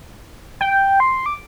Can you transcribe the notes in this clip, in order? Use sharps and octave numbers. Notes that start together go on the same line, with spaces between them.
G5
C6
D6